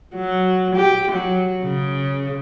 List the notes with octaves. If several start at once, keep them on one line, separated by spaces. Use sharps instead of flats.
F#3
G4
F#3
C#3